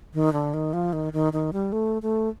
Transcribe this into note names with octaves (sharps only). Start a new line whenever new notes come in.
D#3
D3
D#3
F3
D#3
D#3
D#3
G3
A3
A3